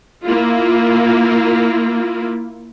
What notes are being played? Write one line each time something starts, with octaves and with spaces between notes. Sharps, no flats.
A#3 E4 F4